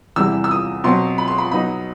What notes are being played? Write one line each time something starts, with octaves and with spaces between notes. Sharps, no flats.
E2 C3 E3 G3 E6
E6
D#6
B2 F#3 C4 C6
B5
C6
B5
B2 F#3 B3 D#4 B5